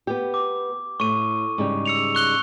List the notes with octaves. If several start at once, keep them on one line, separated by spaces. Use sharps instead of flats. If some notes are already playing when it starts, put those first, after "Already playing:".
B3 G4
D6
A2 C#6 D#7
G#2 C#3 G3
E6 C#7 F7
C#6 F#6 G7